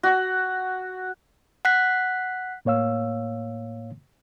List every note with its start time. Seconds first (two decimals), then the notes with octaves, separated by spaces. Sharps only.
0.03 F#4
1.65 F#5 F#6 B6
2.65 A2 A#3 C#5 F5 E6